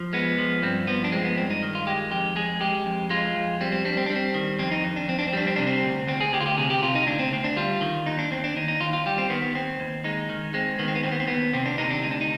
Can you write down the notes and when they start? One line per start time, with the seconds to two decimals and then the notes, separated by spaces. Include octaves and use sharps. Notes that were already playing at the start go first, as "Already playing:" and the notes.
Already playing: F3
0.13 G#3 B3
0.38 F3
0.62 G2 C4
0.87 F3 B3
1.04 D4
1.12 G#3 C4
1.24 B3
1.37 G2 C4
1.50 D#4
1.63 D#3
1.75 F4
1.87 G#3 G4
2.11 F2 G4
2.36 G#3 G#4
2.61 G#3 G4
2.86 F2
3.10 G#3 F4
3.36 F2
3.61 G3 C4
3.72 C4
3.85 G3 D4
3.97 C4
4.06 G3 D4
4.16 C4
4.34 D#3
4.59 F2 C4
4.71 D#4
4.84 F2
4.96 D4
5.08 F2 C4
5.19 D4
5.28 C4
5.33 G3 D4
5.47 C4
5.56 C3 D4
5.67 C4
5.83 D2
6.07 D2 C4
6.21 G#4
6.33 D2 G4
6.40 F4
6.46 G4
6.58 C3 G#4
6.70 G4
6.82 C3 F4
6.95 D#4
7.07 D2 D4
7.19 C4
7.32 D2 C4
7.44 D4
7.57 G3 F4
7.81 D#3
8.06 D#2 D#4
8.19 D4
8.31 D#2 C4
8.44 D4
8.56 D#2 D#4
8.68 D#4
8.80 D#2 F4
8.93 F4
9.06 G3 G4
9.18 C4
9.30 D#3 B3
9.42 B3
9.55 D#2 C4
9.80 D#2
10.04 G#3 D#4
10.29 D#3
10.54 G#3 C4
10.79 D#3 B3
10.88 C4
10.95 B3
11.03 D#2 C4
11.12 B3
11.20 C4
11.28 D#2 B3
11.53 C3 C4
11.66 D4
11.78 C3 D#4
11.90 D4
12.03 D2 D#4
12.11 D4
12.21 D#4